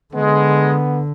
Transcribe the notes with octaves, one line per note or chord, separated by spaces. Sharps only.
D3 G#3 B3